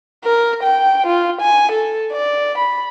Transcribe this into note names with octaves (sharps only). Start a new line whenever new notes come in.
A#4
G5
F4
G#5
A4
D5
B5